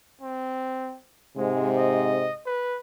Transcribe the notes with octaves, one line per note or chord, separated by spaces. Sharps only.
C4
G#2 C3 G#3
D#5
B4